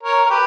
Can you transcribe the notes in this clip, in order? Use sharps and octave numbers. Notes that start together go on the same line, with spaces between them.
A#4 C#5
A#4
G4 B4